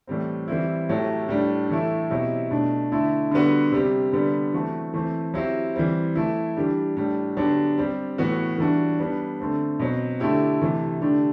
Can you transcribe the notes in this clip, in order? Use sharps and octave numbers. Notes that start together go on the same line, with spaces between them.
A2 E3 G3 C4
E3 G3 C4 E4
A2 F#3 A3 E4 G4
A2 G3 D4
A2 E3 A3 E4
B2 F#3 C4 E4 G4
B2 A3 D4
D3 A3 E4
D3 G3 B3 F#4
C3 G3 C4 G4
D3 G3 B3
E3 A3 C4 F#4
E3 A3 C4
F#3 C4 E4 G4
E3 G3 C4
E3 A3 E4
E3 G3 D4 G4
A2 G3 D4
D3 F#3 B3 D4 G4
G3 C4 G4
A2 E3 B3 F#4
E3 G3 D4 F#4
G3 B3 D4
D3 A3 C4
B2 F#3 C4
D3 A3 E4 G4
C3 E3 A3
D3 A3 D4 G4